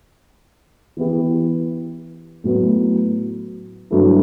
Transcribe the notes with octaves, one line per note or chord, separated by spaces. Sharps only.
E3 B3 E4 G4
A2 F#3 B3
G2 F#3 A3 E4